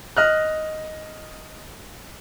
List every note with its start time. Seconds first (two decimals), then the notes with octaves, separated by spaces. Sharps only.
0.17 D#5 F6 F#6